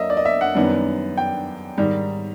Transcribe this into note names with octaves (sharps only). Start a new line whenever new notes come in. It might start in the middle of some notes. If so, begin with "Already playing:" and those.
Already playing: F#3 A#3 D#5 E5
D5
D#5
E5
F#5
F#2 D#3 G3 B3 D4
G5
G#2 D#3 G3